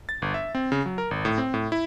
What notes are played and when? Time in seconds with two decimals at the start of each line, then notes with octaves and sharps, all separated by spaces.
0.09 A6
0.22 G1
0.34 E5
0.55 C4
0.72 C#3
0.86 F#3
0.98 A#4
1.11 G#1
1.25 A2
1.38 C4
1.54 A2
1.72 E4